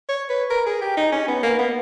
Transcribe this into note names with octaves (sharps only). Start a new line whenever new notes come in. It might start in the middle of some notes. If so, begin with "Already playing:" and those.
C#5
B4
A#4
G#4
G4
D#4
C#4
B3
A#3
B3